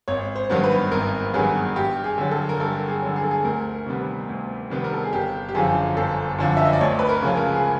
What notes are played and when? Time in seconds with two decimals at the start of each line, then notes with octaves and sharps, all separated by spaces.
0.08 G#1 C#5
0.36 C5
0.50 G2 D#3 F#3 B3
0.64 B4
0.92 G#1 A#4
1.34 G2 D#3 F#3 B3 G#4
1.76 G2 G4
2.04 G#4
2.18 D3 F#3
2.31 A4
2.49 A#4
2.60 G2 A4
2.88 G#4
3.02 D3 F#3
3.16 G#4
3.23 A4
3.31 G#4
3.44 D2 A#4
3.86 C3 D#3 G3 B3
4.29 D2
4.70 C3 D#3 G3 B3
4.84 A#4
4.93 A4
5.03 G#4
5.13 G1 G4
5.49 G4
5.54 F#2 D3 F3 G#4
5.97 G1 A4
6.39 F#2 D3 F3
6.57 E5
6.65 D#5
6.73 D5
6.81 D2 C#5
6.99 B4
7.09 A#4
7.22 C#3 F3 G#3 C#4
7.37 A#4
7.55 G#4